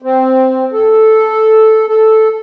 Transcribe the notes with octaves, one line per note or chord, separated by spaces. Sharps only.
C4
A4
A4